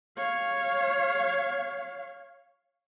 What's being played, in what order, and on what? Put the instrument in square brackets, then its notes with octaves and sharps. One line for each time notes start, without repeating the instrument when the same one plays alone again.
[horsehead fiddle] C#5 F5